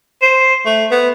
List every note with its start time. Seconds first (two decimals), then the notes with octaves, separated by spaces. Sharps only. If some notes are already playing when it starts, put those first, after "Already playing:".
0.22 C5
0.66 A3
0.91 B3